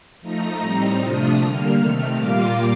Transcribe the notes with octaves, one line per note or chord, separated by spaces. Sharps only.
F3 A3 D#4 A#5
A2 G3 C4 D#4 A#5
C3 F3 A3 D4 F4 D#6
D3 G3 A#3 F6
C3 D#3 A3 F6
A#2 G3 A#3 F4 D6